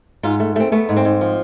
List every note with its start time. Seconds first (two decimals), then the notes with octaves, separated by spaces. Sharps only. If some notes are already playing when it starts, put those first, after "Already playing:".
0.23 G#2 F4
0.40 A3
0.56 A3 C4
0.72 A3 B3
0.89 G#2
0.96 C4
1.05 G#2
1.21 F3